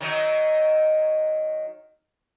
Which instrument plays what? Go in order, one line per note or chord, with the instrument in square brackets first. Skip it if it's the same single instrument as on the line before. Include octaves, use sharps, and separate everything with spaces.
[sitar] D#3 F#3 D#4